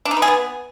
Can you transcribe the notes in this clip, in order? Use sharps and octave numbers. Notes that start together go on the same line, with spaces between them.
D4
D#4
B4
G#4
B3